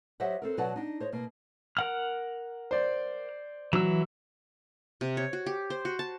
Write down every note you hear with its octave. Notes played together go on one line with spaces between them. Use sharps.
F#3 G4 C5 D#5 E5 F#5
C4 A4 A#4
B2 F#3 B4 D5 F#5 A5
D4 D#4
C5 C#5 D#5
B2 A#3
A#4 F#5 F6
C5 D5
E3 F#3 E6
C3
C#5
F#4
G4
C5
F#4
A5